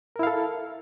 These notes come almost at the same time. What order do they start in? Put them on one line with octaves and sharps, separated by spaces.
A#4 E4 F5 A4